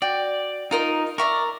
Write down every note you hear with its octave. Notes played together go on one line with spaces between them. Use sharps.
F#4 D5 G5
D#4 F4 A#4 D#5
A#4 D5 E5 C#6